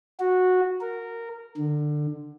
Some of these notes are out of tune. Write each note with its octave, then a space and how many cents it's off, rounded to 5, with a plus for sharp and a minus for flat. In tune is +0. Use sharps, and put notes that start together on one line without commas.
F#4 -10
A#4 -15
D3 +20